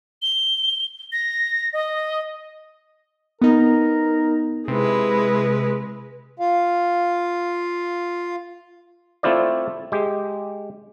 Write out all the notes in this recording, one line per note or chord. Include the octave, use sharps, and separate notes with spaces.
G7
A#6
D#5
B3 D#4 A#4
C3 G#3 E4 B4
F4 F5
A3 C4 E4 F4 C5 D5
G#3 G4